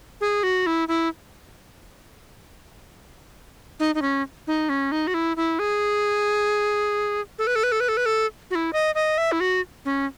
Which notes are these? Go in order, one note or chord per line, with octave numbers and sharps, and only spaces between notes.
G#4
F#4
E4
E4
D#4
D#4
C#4
D#4
C#4
D#4
F#4
E4
E4
G#4
A4
B4
A4
B4
A4
B4
A4
B4
A4
F#4
E4
D#5
D#5
E5
E4
F#4
C#4